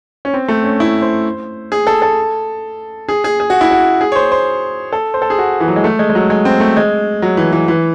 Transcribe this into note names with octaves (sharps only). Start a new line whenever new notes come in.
C#4
C4
A3
C#4
E4
C5
G#4
A4
A4
G#4
G#4
G#4
F#4
E4
F#4
G#4
C#5
C5
C5
A4
C5
A4
G#4
F#4
E3
F#3
G#3
A3
G#3
G#3
F#3
G#3
C4
A3
G#3
F#3
E3
E3
E3